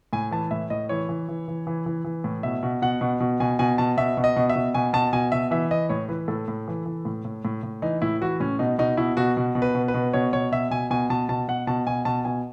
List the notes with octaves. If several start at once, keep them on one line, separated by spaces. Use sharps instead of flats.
A2 G#5
E3 A5
A2 E5
A2 D#5
E3 C#5
E3
E3
E3
E3
E3
E3
A2
B2 E5
B2
B2 F#5
B2
B2
B2 G#5
B2 G#5
B2 A5
B2 E5
B2
D#5
B2
E5
B2
B2 G#5
B2 A5
B2 G#5
B2 E5
E3 E5
E3 D#5
A2 C#5
E3 B4
A2 A4
A2
E3
E3
A2
A2
A2
A2
E3 D#4
A2 E4
E3 F#4
A2 C#4
B2 D#4
B2 D#4
B2 E4
B2 F#4
B2
B2
B4
B2
B4
B2
B2 C#5
B2 C#5
B2 E5
B2 G#5
B2 G#5
B2 A5
B2 A5
B2 F#5
B2 A5
B2 G#5
B2 A5
B2 G#5